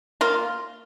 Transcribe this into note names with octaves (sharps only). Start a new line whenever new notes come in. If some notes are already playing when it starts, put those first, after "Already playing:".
A#3 F4